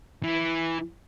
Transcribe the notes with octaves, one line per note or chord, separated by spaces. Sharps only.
E3